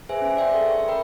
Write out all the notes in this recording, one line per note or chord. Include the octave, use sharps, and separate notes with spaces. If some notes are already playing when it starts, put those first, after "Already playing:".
G#4 B4 C5 E5 G#5
C#4
D5 E5 G5 C6
A4 E5
C#6
A#4 G5 B5